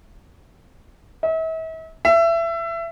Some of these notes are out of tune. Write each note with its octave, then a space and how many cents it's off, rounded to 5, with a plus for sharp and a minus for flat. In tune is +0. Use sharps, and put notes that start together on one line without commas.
E5 -40
E5 +25